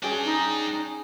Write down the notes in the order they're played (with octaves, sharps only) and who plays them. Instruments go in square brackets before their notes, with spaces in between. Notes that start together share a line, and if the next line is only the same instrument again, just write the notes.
[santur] C#4 G#4 G#5 [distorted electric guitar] D4 G5
[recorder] D#4